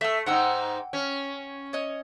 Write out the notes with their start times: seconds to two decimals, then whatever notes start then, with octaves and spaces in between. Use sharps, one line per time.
0.01 A3 E5 E6
0.26 G#2 D#4 F#5 G5 E6
0.93 C#4
1.73 C#5 D#5